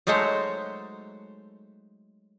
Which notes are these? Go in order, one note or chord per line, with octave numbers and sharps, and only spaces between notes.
F#3 G#3 A3 D#4 C5 C#5